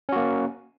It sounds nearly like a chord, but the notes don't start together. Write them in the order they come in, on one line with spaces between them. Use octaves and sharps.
C#4 F#4 A#3